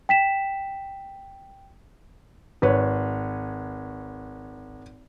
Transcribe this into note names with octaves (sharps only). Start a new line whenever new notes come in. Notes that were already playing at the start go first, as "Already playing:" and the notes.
G5 B6 E7
G#1 B4 C#5